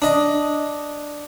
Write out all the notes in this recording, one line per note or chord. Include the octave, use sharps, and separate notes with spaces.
D4 D#5